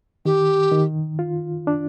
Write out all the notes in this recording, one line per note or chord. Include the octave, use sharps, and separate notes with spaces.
D#3 G4
D#3
F4
D4